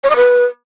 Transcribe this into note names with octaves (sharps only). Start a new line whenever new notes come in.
C#5
D#5
B4